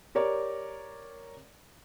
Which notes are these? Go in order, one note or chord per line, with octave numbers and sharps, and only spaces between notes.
G4 A#4 C#5 D5 D6